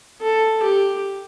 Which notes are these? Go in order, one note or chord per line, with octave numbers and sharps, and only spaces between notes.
A4
G4